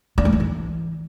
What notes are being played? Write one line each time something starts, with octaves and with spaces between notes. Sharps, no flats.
D4
A3
F#3
E3